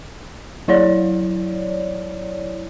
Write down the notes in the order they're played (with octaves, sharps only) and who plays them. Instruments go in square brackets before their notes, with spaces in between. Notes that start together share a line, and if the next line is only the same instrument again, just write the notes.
[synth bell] F#3 E4 C#5 D5